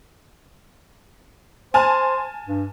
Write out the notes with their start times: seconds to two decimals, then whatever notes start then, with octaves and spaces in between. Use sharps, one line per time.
1.74 C5 G#5 A5 F6
2.46 G2